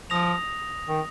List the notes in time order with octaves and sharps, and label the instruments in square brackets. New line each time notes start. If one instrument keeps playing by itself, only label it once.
[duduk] F3 [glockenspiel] D#6 A#6 F7
[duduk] D#3